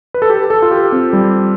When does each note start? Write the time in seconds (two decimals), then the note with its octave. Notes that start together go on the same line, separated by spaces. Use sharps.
0.14 B4
0.22 A4
0.30 G4
0.50 A4
0.62 F4
0.71 G4
0.92 C4
1.13 G3